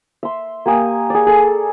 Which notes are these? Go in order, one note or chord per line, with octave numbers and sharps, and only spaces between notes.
E5 C6
A#3 G4 G#5 D#6
G#4 D5
G#4 A4